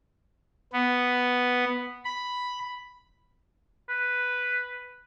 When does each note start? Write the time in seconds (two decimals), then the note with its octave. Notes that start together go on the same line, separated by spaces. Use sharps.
0.73 B3
2.05 B5
3.89 B4